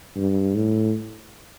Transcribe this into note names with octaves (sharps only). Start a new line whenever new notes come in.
G2
A2